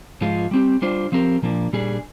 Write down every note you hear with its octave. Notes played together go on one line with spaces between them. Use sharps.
G#2 F3 G#3 F4
G3 C4 G4
G3 D4 F4 C5
F3 C4 G4 A#4
A#2 F3 A#3 D4
A#2 G3 D4 G#4